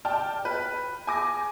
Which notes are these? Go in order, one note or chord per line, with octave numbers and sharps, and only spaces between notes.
D5 G5 A5 F6
B4
G#5 D6 A#6